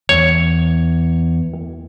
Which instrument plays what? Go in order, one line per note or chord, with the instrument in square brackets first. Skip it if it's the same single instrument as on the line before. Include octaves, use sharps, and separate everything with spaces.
[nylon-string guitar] E2 [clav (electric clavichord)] C#5